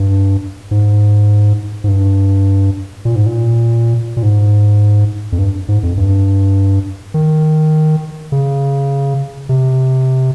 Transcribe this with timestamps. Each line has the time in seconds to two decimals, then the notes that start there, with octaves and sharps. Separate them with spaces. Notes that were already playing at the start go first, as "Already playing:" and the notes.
Already playing: G2
0.71 G#2
1.84 G#2
1.88 G2
3.05 A#2
3.16 G#2
3.26 A#2
4.17 A#2
4.23 G#2
5.32 F2
5.39 G2
5.68 G#2
5.83 F2
5.97 G2
7.14 D#3
8.32 C#3
9.49 C3